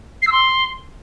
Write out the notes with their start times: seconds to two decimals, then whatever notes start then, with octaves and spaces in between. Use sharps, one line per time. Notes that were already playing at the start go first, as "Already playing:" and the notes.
0.22 C7
0.27 E6
0.32 C6